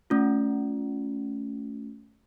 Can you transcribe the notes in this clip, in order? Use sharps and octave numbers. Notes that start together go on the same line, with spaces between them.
A3 C#4 F4